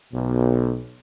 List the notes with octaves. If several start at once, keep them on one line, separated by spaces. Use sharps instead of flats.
B1 B2